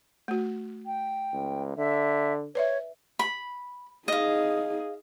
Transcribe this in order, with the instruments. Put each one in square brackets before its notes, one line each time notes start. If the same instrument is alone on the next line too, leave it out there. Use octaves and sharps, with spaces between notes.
[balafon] A3 F#4
[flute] G5
[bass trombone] C#2
[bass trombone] D3 [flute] E5
[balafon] B4 D5 E5 [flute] C#5
[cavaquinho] B5
[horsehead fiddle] D#4 G#4 [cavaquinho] D#5 F5